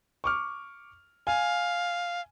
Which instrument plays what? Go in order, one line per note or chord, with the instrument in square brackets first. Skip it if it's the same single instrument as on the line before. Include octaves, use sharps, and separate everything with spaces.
[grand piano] C#6 D6 F6
[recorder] F5 [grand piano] G#5